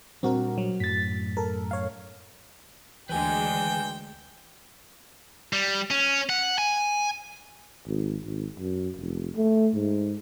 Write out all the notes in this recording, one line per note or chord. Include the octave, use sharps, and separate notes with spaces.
A#2 G3 C4 D4 F#4 A#4
F#3
F#2 A2 A6 B6
A4 A#4
C#5 F5
D2 E3 G#3 D4 B4 G5 G#5
G3
C#4
F#5
G#5
G#1
G#1
F#2
F1
A3
G#2